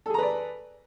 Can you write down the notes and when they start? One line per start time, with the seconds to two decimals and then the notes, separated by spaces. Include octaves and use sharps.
0.06 A4
0.10 G#4
0.14 A#5
0.18 B4
0.23 D5